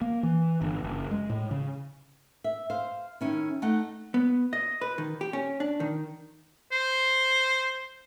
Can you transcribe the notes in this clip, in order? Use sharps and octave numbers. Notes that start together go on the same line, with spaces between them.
A#3
E3
G1
F#1
G#3
A2
C#3
E5
C5 F5
D#3 C#4 E4
A3 D#4 F#5
B3
D#5
B4
D#3
G4
C#4
D4
D#3
C5